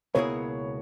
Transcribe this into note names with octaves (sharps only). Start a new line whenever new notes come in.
C#2 B2 A#3 E4 G#4 C#5